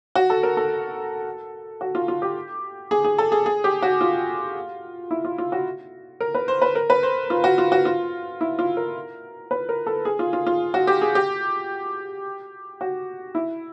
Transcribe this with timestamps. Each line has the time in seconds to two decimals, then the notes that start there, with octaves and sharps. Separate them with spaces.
0.15 F#4
0.30 A4
0.43 A#4
0.57 A4
1.81 F#4
1.95 F4
2.08 F4
2.22 G4
2.91 G#4
3.04 G#4
3.18 A4
3.32 G#4
3.46 G#4
3.64 G4
3.82 F#4
4.01 F4
5.11 E4
5.25 F4
5.38 F4
5.52 F#4
6.20 A#4
6.35 B4
6.48 C5
6.62 B4
6.75 A#4
6.90 B4
7.03 C5
7.30 F4
7.44 F#4
7.58 F4
7.72 F#4
7.85 F4
8.41 E4
8.59 F4
8.77 A#4
9.51 B4
9.69 A#4
9.87 A4
10.05 G#4
10.19 F4
10.33 F4
10.46 F4
10.74 F#4
10.87 G4
11.01 G#4
11.15 G4
12.81 F#4
13.35 E4